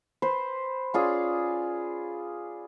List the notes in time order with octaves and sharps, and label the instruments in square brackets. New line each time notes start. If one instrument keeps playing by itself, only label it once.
[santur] B4 C5
C#4 F4 G#4 D5